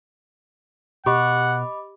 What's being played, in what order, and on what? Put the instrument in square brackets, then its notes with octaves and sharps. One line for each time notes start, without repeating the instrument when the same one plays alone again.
[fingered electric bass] B2 [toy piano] G4 [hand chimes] D#5 B5 D6 [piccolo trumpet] F#5